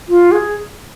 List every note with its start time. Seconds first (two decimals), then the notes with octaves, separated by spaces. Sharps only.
0.09 F4
0.32 G#4